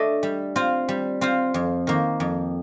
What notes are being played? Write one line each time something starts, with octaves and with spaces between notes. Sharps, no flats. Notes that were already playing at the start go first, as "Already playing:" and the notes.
Already playing: A3 D4 A4 D#5
G3
C4 F4 C5
G3
C4 F4 C5
F2
D#3 A#3
F2